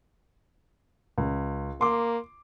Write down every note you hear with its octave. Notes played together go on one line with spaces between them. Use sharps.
C#2
A#3 C6 D6